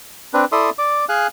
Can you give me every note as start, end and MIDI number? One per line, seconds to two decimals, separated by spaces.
0.34 0.45 60
0.34 0.45 62
0.34 0.45 71
0.52 0.70 64
0.52 0.70 69
0.52 0.70 74
0.52 0.70 76
0.52 0.70 84
0.52 0.70 87
0.78 1.05 74
0.78 1.05 86
1.09 1.27 68
1.09 1.27 77
1.09 1.27 80
1.09 1.27 90